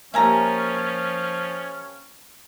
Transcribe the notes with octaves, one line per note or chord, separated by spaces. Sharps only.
F3 A#3 C#4 G4 E5 G#5 A#5